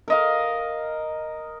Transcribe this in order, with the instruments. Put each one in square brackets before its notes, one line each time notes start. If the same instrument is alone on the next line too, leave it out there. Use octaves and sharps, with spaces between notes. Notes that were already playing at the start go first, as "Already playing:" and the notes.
[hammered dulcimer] A#4 D#5 F5